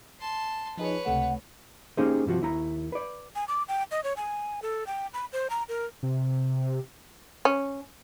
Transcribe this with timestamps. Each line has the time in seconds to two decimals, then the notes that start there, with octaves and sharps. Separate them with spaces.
0.20 A5 C6
0.77 F3 D#4 G#4 B4 C#5
1.06 C#2 C3 A3 F#5
1.97 A#3 C#4 D#4 G4 G#4 C5
2.26 G2 C3 F3 F#4
2.41 D#2 E4 A#5
2.92 B4 D5
3.35 G#5
3.48 D6
3.68 G5
3.91 D#5
4.04 C#5
4.17 G#5
4.62 A4
4.87 G5
5.14 B5
5.33 C5
5.50 A#5
5.68 A#4
6.03 C3
7.45 C#4